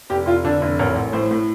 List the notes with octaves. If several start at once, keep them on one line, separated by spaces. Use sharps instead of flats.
F1 G4
F1 F4
D3 D4
F1
A1 A#4
A1
A2 C5
A2